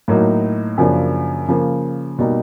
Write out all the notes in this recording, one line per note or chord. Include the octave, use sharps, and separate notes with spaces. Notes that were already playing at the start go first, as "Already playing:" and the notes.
A2 F#3 A#3 D#4
F#2 C#3 F3 A#3 D4
C#3 F3 A#3
B2 G3 A#3 D#4